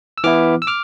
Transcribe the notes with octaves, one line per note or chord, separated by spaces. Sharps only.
E6
E3 B3 E4 D6 F6
E6
D6 F6